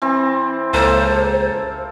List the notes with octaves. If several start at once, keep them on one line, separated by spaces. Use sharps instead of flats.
E3 C4
C#2 A#3 A4 C5 A5